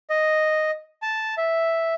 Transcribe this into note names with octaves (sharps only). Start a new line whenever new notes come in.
D#5
A5
E5